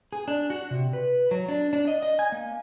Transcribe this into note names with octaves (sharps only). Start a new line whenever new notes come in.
G#4
D4
F#4
C3
B4
F#3
D4
D4
D#5
D#5
G#5
A#3